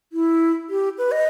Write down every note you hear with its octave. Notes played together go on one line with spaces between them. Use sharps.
E4
G4
B4
D#5